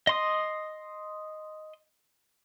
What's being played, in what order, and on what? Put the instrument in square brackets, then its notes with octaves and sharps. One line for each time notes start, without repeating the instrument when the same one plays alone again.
[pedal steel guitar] D#5 C6 D#6